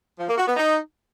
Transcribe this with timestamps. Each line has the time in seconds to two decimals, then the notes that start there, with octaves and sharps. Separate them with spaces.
0.19 F3
0.28 A#3
0.37 F#4
0.47 B3
0.56 D#4